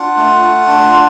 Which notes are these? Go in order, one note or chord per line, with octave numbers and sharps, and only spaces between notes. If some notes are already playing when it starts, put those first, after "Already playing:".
Already playing: D4 F4 F#5
A3
F4
D4
F4